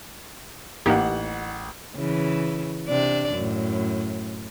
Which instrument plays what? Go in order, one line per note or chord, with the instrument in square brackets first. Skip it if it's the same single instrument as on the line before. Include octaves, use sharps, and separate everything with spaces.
[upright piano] A1 F#5 [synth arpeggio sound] A#3 D#4 G4
[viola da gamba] C#3 E3
C3 D4 D5
F#2 A2